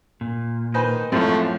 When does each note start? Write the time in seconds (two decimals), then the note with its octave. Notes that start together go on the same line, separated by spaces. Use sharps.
0.21 A#2
0.74 D#3 D#4 B4 C5 G#5
1.12 F#2 A2 F3 G#3 A3 C4